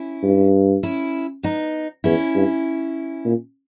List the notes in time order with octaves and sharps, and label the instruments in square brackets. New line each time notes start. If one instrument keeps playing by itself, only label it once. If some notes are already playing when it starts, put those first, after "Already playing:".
Already playing: [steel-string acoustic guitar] C#4 E4
[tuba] G2
[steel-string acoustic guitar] C#4 E4
B3 D#4
[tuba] E2 [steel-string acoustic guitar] C#4 E4
[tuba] G2
A#2